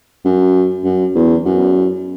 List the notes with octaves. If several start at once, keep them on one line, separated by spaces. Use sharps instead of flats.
F#2
F#2
E2
F#2